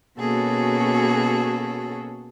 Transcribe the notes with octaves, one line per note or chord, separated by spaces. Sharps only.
B2 A#3 C#4 F#4 G#4 A4